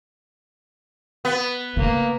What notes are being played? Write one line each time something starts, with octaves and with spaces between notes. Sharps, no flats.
B3
C#3 A3 A#3